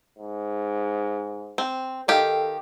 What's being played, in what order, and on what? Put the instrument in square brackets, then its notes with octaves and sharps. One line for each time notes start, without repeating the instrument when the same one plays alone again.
[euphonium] G#2
[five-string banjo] C4
[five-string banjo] D#3 G4 F5 [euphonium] A4